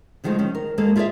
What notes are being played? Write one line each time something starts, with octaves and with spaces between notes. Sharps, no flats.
D3 D#3 F3 G#3 A3
D#3 C#4
A#4
D#2 G#3 A#3 A4
E4 F4 G#4 A4 D5 E5